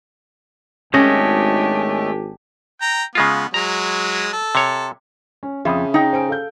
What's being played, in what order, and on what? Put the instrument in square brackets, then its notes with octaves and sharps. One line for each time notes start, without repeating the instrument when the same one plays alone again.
[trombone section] G#1 [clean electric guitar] G#3 A3 D#5 [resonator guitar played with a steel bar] C#4 [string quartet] D4 G4 G#5
[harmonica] G5 A#5
[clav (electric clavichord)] C#3 G#3 F4 [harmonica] B3
[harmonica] F#3 G#3 [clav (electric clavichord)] A#5
[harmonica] A4
[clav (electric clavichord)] C3 C#5
[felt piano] C#4
[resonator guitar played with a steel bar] F2 [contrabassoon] C#3 [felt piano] E5 B5 D#6
[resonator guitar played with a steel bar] D#4 G5
[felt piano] C5 G#5 D7
A4 F5 G6